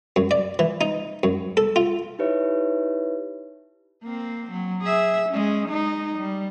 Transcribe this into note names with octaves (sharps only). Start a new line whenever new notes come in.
F#2
D5
E3
D#4
F#2
A4
F4
D#4 E4 G4 B4 C#5 E5
A#3 C4
F#3
G#4 E5
G#3 C#4
G#3 D#4
G3